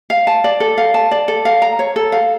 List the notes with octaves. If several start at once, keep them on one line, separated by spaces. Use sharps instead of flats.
F5
A5
D5
A4
F5
A5
D5
A4
F5
A#5
C#5
A4
F5